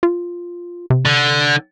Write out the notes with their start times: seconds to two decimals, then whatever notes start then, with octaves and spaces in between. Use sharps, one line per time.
0.03 F4
0.90 C3
1.06 D3